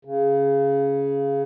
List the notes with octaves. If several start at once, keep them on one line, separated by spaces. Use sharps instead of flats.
C#3